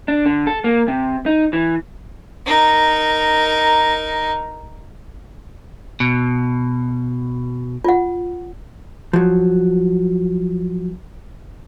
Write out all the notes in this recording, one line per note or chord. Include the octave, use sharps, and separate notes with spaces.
D4
D3
A4
A#3
C3
D#4
E3
D#4 A#4
B2
F4 F#5
F3 F#3